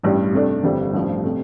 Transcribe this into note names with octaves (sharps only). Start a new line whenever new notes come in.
A1 G2 G3
C3 A3 D4
G1 F2 D3 G3
A1 G2 F3
C3 A3